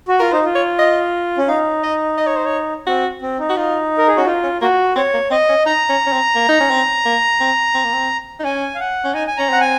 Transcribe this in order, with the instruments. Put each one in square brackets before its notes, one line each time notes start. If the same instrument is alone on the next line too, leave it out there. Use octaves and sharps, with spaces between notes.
[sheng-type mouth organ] F#4
[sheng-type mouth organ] F4 [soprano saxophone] A#4
[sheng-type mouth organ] D#4 [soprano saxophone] C5
[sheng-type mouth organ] F4
[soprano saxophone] C#5
D#5
[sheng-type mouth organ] C#4
[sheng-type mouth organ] D#4 [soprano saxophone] F5
[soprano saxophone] D#5
D#5
C#5
C5
C#5
[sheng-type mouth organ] C4 [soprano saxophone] F#4
[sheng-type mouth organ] C4
D#4
[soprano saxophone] F#4
[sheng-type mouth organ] D#4 [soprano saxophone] F4
[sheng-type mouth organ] A#4
G#4
[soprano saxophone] C#4 [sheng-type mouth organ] F#4
[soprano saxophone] D#4 [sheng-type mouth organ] F4
[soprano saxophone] C#4
[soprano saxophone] A#3 [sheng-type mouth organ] F#4
[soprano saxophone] C4 [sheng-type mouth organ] C#5
[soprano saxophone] A#3
[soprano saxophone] C4 [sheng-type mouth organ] D#5
[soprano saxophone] C#4
[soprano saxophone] D#4 [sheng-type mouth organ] A#5
[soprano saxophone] C#4
C#4
C4
A#3
D#4
C#4
C4
A#3
C4
C4
A#3
C4
D#4
[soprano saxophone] C#4 [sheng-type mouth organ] G#5
[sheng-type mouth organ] F5
F#5
[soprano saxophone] C#4
[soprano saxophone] D#4 [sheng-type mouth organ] G#5
[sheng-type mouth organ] G#5
[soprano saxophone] C#4 [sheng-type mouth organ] A#5
[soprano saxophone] C4 [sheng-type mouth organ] F#5
[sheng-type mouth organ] G#5